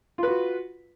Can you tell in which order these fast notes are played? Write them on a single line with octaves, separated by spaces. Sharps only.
F4 B4 F#4